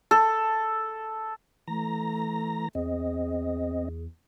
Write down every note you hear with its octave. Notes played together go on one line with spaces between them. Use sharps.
A4
E3 A3 A#5 A#6
E2 C4 G#4 D#5